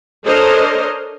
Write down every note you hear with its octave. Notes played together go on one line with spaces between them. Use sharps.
D4 A4 A#4 C5 C#5 D#5